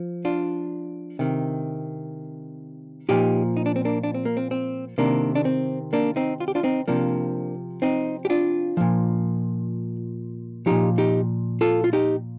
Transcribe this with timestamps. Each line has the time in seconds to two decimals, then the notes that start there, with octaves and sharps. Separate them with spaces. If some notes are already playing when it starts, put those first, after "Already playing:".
Already playing: F3
0.25 D4 F4
1.19 C3 D#3
3.09 A#2 F3 D#4 G4
3.57 D#4
3.66 D4
3.76 C4
3.85 A#3 D4
4.03 D4
4.14 C4
4.25 A#3
4.37 C4
4.51 C4
4.98 C3 D#3 A#3 D4
5.35 D4
5.45 C4
5.93 A#3 D4
6.16 C4 D#4
6.40 F4
6.48 G4
6.55 D4 F4
6.63 C4 D#4
6.88 C3 F3 A#3 D4
7.82 C4 D#4
8.25 G4
8.30 D4 F4
8.77 A#2 F3
10.66 A#2 F3 D#4 G4
10.98 D#4 G4
11.61 F4 A4
11.84 F4
11.93 D#4 G4